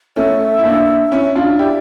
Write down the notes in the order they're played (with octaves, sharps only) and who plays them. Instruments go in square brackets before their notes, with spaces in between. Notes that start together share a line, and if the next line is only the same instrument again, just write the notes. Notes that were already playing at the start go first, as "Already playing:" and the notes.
[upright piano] A3 C#4 [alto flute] E5
[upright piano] E4
A#3 D4
C#4 E4
D4 F4
[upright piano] E4 G4 [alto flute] D5